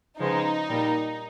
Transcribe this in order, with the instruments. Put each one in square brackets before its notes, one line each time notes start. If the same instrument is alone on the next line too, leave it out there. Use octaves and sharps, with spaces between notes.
[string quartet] C#3 F3 G#3 B3 [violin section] D#4
[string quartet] A#2 G3 A#3